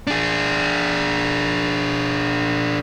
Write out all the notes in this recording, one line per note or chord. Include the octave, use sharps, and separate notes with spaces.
D4 G#4